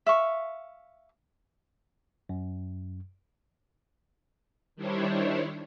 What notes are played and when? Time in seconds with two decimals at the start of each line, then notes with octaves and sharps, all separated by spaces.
0.06 E5 F5 C#6
2.29 F#2
4.76 D#3 G3 D4 E4 C5 C#5